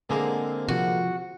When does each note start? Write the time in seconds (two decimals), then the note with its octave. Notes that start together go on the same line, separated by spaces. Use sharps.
0.10 D3 G#3 A#3 C4 G#4 A#4
0.68 C3 F3 F#4